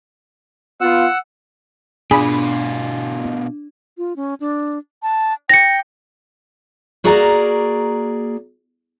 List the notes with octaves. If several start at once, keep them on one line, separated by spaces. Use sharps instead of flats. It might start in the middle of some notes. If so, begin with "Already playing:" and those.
B3 F4 F#5 E6
B2 D4 F4 G#4 B5
F4
C#4
D4
A5
G5 A#6 C#7
A#3 F#4 G#4 A#4 D5 A#5